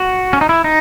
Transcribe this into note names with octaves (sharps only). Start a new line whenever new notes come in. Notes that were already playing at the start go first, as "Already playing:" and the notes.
Already playing: F#4
C#4
D#4
E4
D#4